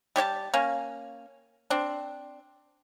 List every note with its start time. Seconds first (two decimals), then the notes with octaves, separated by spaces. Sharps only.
0.16 G3 G4 C#5 A5
0.54 A#3 C#4
1.70 C4 D4